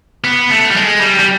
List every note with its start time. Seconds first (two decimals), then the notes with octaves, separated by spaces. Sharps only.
0.24 B3
0.50 A3
0.71 G3
0.76 G#3
1.01 G3
1.19 G3